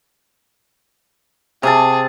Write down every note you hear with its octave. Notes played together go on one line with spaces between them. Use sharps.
C3 G#4 A5